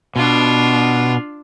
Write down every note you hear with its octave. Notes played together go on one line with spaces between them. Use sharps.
B2 D4 F4